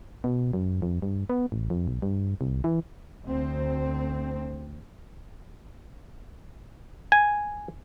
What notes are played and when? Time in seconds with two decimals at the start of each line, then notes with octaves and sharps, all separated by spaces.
0.24 B2
0.53 F#2
0.82 F2
1.02 G2
1.30 B3
1.52 A1
1.70 F2
1.87 B1
2.02 G2
2.41 C2
2.64 E3
3.25 D2 C4
7.12 G#5